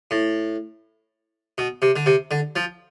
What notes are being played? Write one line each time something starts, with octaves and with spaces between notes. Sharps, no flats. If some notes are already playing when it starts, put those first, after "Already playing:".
A2
B2
C3
D3
C3
D3
F3